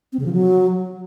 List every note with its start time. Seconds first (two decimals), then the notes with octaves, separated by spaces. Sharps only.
0.13 C4
0.19 C#3
0.26 F3
0.33 F#3